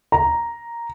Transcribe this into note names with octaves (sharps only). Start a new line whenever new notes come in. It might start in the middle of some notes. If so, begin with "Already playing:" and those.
A#5